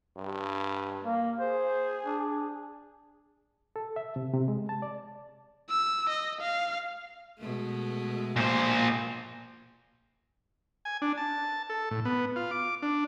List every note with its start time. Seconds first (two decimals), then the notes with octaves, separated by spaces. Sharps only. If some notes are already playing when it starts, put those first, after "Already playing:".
0.17 G2
1.05 A#3
1.40 G#4 C5
2.05 D4
3.76 A4
3.96 E5
4.16 C3
4.34 C3
4.48 G#3
4.69 A5
4.82 D5
5.70 E6
6.09 D#5
6.41 F5
7.39 B2 G#3 A3
8.36 A#2 C5
10.85 G#5
11.02 D4
11.17 A5
11.70 A4
11.91 A2
12.05 B3
12.36 F4
12.51 D6
12.82 D4